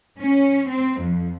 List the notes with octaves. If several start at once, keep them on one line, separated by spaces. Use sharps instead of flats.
C#4
C4
F2